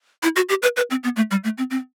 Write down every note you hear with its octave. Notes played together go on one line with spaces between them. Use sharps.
E4
F#4
G4
B4
B4
C4
B3
A3
G3
A3
C4
C4